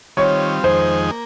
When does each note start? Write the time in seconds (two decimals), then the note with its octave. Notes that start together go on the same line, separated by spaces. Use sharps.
0.17 D#3 G3 C4 F4 C#5
0.63 F2 D#3 G#3 D#4 G#4 C5
1.11 A#3